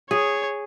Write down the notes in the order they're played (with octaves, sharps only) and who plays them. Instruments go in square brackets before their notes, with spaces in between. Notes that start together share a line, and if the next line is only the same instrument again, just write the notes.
[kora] G#4 [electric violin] C#5